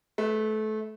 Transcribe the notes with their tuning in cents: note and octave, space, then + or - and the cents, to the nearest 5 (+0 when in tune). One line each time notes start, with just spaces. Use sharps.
A3 -25 B4 +0